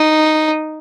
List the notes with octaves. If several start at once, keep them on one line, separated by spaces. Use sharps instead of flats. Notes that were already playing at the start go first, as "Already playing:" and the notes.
Already playing: D#4